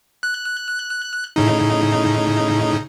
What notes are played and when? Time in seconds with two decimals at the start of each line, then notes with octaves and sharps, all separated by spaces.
0.23 F#6
1.36 A2 C#3 D#4